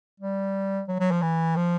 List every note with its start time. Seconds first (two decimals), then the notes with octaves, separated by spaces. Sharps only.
0.20 G3
0.88 F#3
1.00 F#3
1.11 F3
1.22 E3
1.56 F3